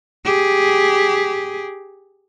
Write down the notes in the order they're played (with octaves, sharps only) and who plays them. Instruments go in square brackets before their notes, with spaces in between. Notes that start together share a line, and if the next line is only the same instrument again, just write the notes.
[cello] G4 G#4